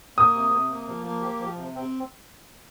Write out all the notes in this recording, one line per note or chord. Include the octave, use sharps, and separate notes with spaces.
A#3 D#6
C3
C3
A#3
F3
A#3
G4
F3
C3
C4